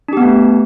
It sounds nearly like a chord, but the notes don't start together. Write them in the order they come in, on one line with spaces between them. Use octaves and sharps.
D4 G4 B3 A3